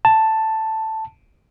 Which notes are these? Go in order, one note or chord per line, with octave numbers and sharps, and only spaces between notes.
A5